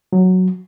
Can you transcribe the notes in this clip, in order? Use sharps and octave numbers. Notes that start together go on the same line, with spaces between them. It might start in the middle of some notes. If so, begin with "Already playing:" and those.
F#3